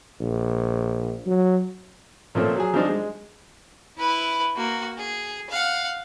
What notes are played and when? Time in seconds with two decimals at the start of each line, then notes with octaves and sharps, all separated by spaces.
0.20 A#1
1.26 F#3
2.35 A#2 F3 A3 C4 C#4 A4
2.56 F#3 G#4
2.74 F3 G3 C4 D4 D#4 C5
2.89 G#3
3.98 E4 B4
4.56 A#3 F#4
4.98 G#4
5.50 F5 F#5